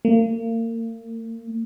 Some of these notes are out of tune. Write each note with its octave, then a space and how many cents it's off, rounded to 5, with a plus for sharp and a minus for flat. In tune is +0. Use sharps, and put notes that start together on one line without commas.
A#3 -35